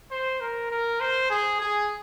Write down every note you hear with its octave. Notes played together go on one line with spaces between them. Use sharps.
C5
A#4
A#4
C5
G#4
G#4